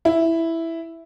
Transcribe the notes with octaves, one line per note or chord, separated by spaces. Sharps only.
E4